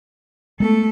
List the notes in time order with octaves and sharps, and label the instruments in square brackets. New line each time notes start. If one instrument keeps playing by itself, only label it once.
[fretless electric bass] G#3 B3 [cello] A3 A4